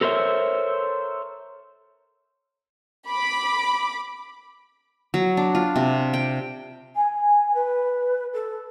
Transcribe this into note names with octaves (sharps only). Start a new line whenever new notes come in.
A4 A#4 C5 C#5 E5
B5 D6
F#3
D4
F4
C3
G5
G#5
B4
A4